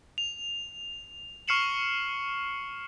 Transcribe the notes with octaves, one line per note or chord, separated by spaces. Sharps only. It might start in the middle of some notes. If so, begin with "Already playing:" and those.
F7
C#6 F6 C7 C#7 E7 F#7